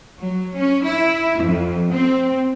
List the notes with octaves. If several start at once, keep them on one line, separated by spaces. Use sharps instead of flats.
F#3
C#4
E4
F2
C4